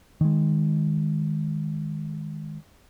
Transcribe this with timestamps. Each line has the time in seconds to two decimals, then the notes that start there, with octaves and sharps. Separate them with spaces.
0.21 D#3 G#3